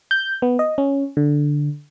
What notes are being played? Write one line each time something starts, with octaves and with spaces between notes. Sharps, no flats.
G6
B3
D#5
C#4
D3